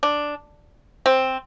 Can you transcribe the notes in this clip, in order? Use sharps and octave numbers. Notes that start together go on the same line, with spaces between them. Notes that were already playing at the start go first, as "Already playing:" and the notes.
D4
C4